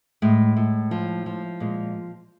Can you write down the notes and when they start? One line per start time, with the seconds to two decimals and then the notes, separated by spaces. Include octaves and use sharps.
0.22 A2 G#3
0.57 A2
0.91 F3
1.26 F3
1.60 A#2 G#3